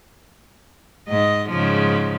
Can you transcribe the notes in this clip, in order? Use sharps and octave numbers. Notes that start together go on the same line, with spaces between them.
G#2 D#5
G#2 C#3 F3